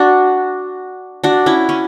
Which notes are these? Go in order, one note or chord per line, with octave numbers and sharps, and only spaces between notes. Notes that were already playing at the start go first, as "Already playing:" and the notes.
Already playing: D4 F#4
D4 F#4
C#4 E4
C#4